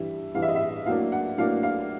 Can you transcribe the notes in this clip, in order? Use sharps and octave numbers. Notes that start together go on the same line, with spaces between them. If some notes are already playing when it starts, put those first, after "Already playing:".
Already playing: G2 E3 G3 E5
G2 E3 G3 F5
E5
D#5
E5
A2 F#3 A#3 D4 F5
F#5
A2 F#3 A#3 D4 F5
F5